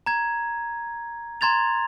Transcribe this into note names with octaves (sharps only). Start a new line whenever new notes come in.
A#5 G#6
A#5 C6 G#6 A6 F7